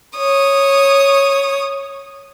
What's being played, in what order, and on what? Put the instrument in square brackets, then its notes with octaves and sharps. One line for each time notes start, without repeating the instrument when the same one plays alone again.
[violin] C#5 D#6